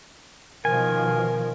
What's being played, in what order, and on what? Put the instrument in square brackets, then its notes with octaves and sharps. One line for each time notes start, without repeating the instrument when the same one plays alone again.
[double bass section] B2 D#3 F3 [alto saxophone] A#4 [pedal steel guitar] G#5